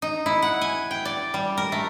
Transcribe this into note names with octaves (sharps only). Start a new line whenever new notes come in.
D#4
E4
F#5
G#5
G5
D5
G3
A#4
A3